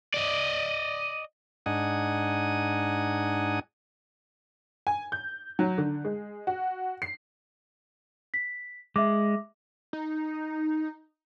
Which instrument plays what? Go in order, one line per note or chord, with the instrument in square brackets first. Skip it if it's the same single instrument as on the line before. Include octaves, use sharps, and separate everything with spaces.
[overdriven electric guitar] D5 D#5
[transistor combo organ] G#2 D4 D#4 F#5 G#5 D#6
[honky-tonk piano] G#5
G6
F#3
D3
G#3
F#4
C7
[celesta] B6
[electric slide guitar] G#3 [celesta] E5 D6
[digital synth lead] D#4